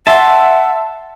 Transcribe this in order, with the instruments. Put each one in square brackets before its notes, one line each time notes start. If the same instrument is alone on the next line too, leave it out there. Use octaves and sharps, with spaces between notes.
[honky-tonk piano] E5 [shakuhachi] F#5 [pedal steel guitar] A5 C6